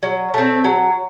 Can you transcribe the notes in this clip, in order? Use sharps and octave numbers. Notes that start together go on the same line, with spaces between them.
F#3
A3 C4
F#3